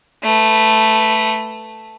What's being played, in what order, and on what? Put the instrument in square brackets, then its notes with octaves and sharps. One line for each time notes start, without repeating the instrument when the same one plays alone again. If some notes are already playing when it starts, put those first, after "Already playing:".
[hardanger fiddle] A3 B4